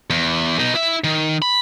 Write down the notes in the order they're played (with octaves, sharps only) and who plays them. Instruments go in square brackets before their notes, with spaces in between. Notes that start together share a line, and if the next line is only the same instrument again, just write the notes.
[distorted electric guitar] E2
B2 D#4
E4 E5
D#3
B5